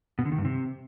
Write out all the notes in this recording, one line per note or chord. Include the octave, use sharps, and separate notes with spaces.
B2
D3
D#3
G2
C3